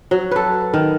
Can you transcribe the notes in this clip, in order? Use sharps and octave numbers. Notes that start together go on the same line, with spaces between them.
F#3
A4 B4
D#3